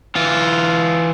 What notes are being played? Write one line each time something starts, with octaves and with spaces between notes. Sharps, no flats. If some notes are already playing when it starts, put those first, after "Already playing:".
E3 F4